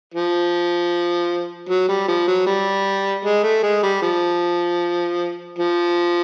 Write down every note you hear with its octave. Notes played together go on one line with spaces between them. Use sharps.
F3
F#3
G3
F3
F#3
G3
G#3
A3
G#3
G3
F3
F3